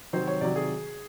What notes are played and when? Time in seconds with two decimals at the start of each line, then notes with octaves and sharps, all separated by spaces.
0.13 C3 D#3 F#3 C5
0.27 C#5
0.41 C3 D#3 F#3 D5
0.56 G#4